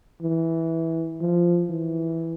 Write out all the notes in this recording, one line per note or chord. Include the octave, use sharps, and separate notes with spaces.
E3
F3
E3